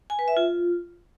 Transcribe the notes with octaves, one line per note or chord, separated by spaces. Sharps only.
G#5
B4
E5
F4